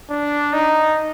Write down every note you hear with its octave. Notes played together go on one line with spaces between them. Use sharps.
D4
D#4